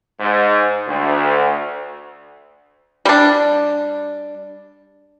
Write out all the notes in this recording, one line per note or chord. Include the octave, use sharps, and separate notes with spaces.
G#2
D2
G3 D4